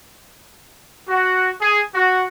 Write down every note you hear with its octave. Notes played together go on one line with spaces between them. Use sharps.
F#4
G#4
F#4